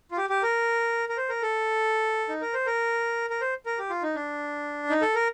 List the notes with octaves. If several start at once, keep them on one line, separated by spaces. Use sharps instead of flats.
F4
G4
G4
A#4
A#4
C5
A#4
A4
D#4
A#4
C5
A#4
A#4
C5
A#4
G4
F4
D#4
D4
D#4
A4
A#4